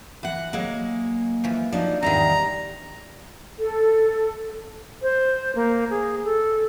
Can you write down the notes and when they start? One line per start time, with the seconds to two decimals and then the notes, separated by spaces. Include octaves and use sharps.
0.23 E3 F#5
0.53 F#3 G#3 A#3
1.44 E3 F3
1.72 F3 F#3 D4 D#4
2.03 E2 G#2 D#3 G3 A#5
3.58 A4
5.02 C5
5.56 A#3
5.90 G#4
6.25 A4